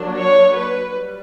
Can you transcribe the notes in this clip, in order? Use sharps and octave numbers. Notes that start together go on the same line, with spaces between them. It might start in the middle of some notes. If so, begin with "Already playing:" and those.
Already playing: F#3 A#3 D4
C#5
B4
G3